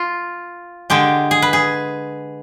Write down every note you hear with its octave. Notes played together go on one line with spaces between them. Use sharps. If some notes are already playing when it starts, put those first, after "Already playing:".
Already playing: F4
D3 G#3 G4
G#4
B4
G#4